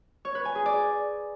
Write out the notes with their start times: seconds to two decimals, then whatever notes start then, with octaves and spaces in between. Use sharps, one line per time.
0.25 C#5
0.35 B4
0.45 G#5
0.55 G#4
0.66 D5